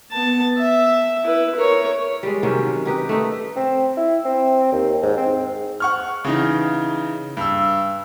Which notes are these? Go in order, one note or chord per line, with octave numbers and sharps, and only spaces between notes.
B3 A5
E5
E4 B4
A#4 C#5
G3 G#3
C3 D#3 F#3 C#4
D#4 G4 B4
A3 D#4
C4
E4
C4
D#2
G#2
C4
G#2
F#5 C#6 F6
C#3 E3 D#4
G2 E6